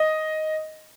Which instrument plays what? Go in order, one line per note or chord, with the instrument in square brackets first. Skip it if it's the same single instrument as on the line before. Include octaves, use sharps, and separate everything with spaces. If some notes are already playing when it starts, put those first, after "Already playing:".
Already playing: [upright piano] D#5